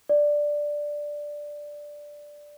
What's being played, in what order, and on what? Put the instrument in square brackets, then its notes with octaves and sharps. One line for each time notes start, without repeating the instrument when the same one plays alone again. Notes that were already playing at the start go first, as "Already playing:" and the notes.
[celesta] D5